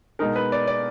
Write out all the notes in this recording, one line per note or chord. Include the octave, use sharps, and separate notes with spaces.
B2 G#3 D#4 A#4
B4
D5
D5